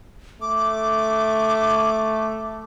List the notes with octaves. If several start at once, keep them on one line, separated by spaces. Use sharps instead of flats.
A3 D6